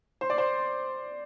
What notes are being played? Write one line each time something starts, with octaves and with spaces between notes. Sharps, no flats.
C5
D5
C5